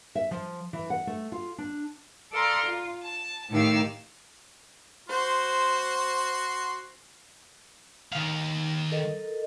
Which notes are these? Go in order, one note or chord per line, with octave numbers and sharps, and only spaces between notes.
E5
F3
E3
F#5
A3
F4
D4
A4 D5 F5 A#5 C6
F4
A5
A2 D#3 D#4 G4 F5 E6
F#4 C5 C6
D#3 F5
A4 A#4 D#5